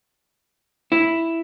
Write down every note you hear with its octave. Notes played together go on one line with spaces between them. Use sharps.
E4